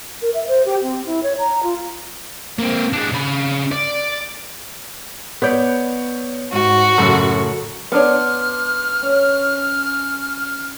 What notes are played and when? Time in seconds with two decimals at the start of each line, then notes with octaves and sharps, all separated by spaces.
0.22 A#4
0.34 E5
0.48 C5
0.65 G4
0.82 C4
1.06 E4
1.23 C#5
1.39 A#5
1.63 F4
2.59 A#3 C4
2.93 G#3 D4
3.12 C#3 B5
3.72 D5
5.42 B3 B4 C#5 D5 G6
6.52 G#2 F#4
6.98 F#2 A2 C#3 A4
7.92 B3 D4 C#5 D5 C6 D6 F6
9.02 C#4